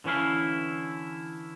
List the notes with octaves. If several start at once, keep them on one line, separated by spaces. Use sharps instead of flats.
D3 E3 C#4 E4 F5